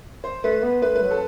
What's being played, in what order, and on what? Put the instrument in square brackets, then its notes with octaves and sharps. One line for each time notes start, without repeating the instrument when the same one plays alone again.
[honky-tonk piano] C5
[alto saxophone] A3 [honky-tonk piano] B4
[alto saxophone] B3
[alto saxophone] A3 [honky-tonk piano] B4
[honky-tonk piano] B4
[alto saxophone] F#3
[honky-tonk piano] A4